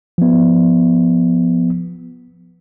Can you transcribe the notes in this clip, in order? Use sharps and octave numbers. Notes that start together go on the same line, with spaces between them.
F3 B3